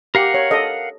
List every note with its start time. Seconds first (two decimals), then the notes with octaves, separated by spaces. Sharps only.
0.15 G4 A#4 F5 F#5
0.34 C#5
0.51 A4 D#5